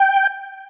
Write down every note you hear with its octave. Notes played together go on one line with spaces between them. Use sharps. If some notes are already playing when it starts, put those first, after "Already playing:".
Already playing: G5